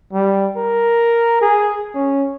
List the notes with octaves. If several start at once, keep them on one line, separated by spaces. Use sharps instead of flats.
G3
A#4
G#4
C#4